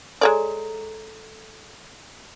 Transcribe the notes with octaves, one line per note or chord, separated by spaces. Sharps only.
G#3 A4 C#5 D5 A#5